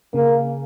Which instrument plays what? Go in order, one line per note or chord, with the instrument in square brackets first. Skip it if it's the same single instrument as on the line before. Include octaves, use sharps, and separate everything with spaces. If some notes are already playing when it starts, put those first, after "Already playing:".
[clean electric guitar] C#3 [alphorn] A#3